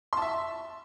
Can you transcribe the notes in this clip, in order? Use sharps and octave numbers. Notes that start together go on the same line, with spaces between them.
E5 A5 C6